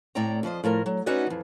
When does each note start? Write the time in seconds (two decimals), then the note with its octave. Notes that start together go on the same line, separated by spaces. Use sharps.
0.15 A2 C4 D5 G5 A#5
0.43 F2 F3 C5 D#5
0.64 A2 F3 A#4
0.86 F#3
1.06 C#4 D#4 F#4 B4 D5 D#5
1.27 F2 E3